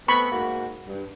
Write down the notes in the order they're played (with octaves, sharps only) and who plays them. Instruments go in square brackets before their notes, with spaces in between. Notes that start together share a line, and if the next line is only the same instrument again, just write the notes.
[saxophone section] A3 B3 C4 [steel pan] B5 C#6
[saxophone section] G#2 A#3 F#4
G2